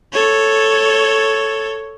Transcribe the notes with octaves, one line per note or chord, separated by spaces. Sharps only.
A4 C#5